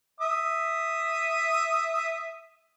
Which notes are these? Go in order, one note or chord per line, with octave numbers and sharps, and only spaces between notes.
E5 D#6